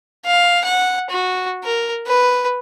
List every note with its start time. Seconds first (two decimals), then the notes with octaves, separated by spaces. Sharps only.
0.25 F5
0.64 F#5
1.10 F#4
1.64 A#4
2.06 B4